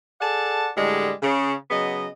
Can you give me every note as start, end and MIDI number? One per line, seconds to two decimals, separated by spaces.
0.21 0.69 68
0.21 0.69 69
0.21 0.69 74
0.21 0.69 78
0.21 0.69 81
0.77 1.12 45
0.77 1.12 50
0.77 1.12 55
0.77 1.12 56
1.23 1.54 49
1.71 2.07 49
1.71 2.07 54
1.71 2.07 59
1.71 2.07 75